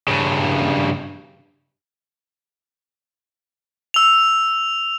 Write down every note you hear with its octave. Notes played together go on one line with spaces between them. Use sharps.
G2 C#3
E6 F7